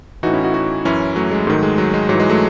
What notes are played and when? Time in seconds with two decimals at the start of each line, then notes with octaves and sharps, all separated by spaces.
0.23 A2 E3 D#4 F#4
0.33 C#4 E4
0.44 D#4 F#4
0.54 D#4 F#4
0.85 F#2 E3 C#4 E4
1.16 F#3 A3
1.31 G#3
1.47 G#2 D#3 F#3 A3
1.63 G#3
1.78 F#3
1.94 G#3
2.09 G#2 E3 F#3
2.20 G#3
2.30 F#3 A3